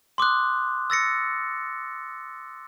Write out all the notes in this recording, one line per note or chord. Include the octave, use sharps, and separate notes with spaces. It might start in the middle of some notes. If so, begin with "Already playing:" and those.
C6 D6 D#6 F#6
E6 A6 A#6 C#7